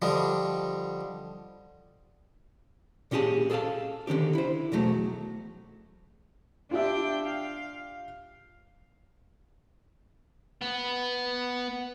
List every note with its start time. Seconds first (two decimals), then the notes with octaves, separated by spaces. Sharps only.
0.02 D3 F3 G3 D4 D#4
3.11 A#2 C#4 G4 G#4 A5
3.50 G#4 A4 E5 F5 A5
4.07 D3 D#3 C#4 G4
4.35 E4 C5
4.72 B1 E2 F#3 A3
6.71 D4 F4 G4 E5 G5
7.26 F5
10.62 B3